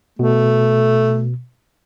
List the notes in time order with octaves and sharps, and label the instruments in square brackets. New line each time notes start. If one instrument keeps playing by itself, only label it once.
[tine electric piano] B2 [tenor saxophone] A3